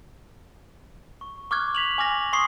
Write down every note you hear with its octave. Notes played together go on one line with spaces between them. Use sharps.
C#6
C#6 D6 F6 F#6 G#6
B6 F7 F#7
G#5 D6 F6 A#6 F7
C6 C#6 D#6 C7